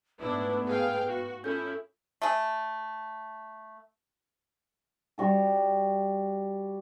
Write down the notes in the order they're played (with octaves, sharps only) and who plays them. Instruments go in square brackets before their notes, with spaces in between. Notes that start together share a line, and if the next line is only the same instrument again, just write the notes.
[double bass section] G#2 A3 B3 [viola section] D4 E4 [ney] B4
[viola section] G#4 F5 G5
F#4
[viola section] C#4 E4 [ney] F4 [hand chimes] A4 G6
[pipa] A3 G#4
[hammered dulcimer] G3 F#4 A4